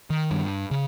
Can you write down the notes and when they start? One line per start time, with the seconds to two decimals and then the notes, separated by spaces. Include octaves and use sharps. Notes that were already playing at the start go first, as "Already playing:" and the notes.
0.10 D#3
0.31 G2
0.71 C#3